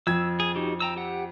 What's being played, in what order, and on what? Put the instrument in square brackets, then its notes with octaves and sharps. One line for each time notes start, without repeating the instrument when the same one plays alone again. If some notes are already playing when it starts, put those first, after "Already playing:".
[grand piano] F2 G#6 [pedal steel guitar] E6
[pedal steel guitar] G#4
D#4 F#4 G4
G5 A#5 E6
G4 F#5